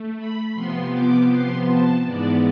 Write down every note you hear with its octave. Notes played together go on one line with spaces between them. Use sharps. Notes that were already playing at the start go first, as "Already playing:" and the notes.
Already playing: A3
B5
C3 F3 B3 C6
D6
C6
A5
G#2 E3 G#3 B3 D5